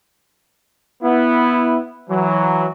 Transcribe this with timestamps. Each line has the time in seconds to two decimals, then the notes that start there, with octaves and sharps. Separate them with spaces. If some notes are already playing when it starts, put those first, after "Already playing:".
1.03 B3 E4
2.10 E3 F#3